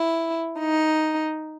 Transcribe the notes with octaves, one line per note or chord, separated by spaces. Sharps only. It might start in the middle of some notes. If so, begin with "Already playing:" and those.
Already playing: E4
D#4